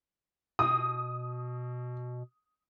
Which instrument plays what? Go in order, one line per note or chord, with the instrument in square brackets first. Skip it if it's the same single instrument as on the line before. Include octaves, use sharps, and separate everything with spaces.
[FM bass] B2 [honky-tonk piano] D#6